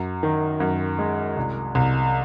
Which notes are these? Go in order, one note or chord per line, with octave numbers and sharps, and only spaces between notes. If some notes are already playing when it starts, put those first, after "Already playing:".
Already playing: F#2
D#3
F#2
G#3
C2
C2